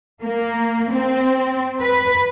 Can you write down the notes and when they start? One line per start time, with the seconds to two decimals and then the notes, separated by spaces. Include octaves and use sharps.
0.23 A#3
0.91 C4
1.81 B4